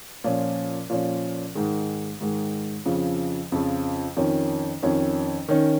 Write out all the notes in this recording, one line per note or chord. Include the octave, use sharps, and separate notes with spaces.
A#2 F3 C#4
A#2 F3 C#4
G#2 D#3 G#3
G#2 D#3 G#3
F2 C#3 F3
F2 C#3 F3
F2 D#3 C#4
F2 D#3 C#4
D#3 C#4